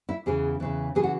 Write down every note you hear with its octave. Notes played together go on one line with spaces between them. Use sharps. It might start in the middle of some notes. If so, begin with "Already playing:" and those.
E4
E2 C#3 E3 G#4
E2 C#3 E3
C#3 E3 G#4
F#4